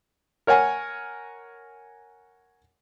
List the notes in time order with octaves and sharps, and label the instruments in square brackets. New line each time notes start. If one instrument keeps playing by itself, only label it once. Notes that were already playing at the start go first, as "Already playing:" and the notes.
[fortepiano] A#4 C#5 F#5 G#5